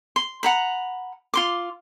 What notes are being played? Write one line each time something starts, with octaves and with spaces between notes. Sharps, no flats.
C6
F#5 A#5 B5
F4 C6 D6